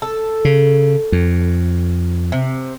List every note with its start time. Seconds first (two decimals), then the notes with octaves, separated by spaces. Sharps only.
0.02 A4
0.45 C#3
1.12 F2
2.32 C3